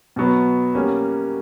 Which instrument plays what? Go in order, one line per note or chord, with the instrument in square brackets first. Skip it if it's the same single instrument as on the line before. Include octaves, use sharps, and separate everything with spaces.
[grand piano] B2 F#3 B3
G3 A#3 C#4